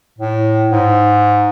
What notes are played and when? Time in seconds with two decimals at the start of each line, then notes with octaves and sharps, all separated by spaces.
0.18 A2
0.70 G#2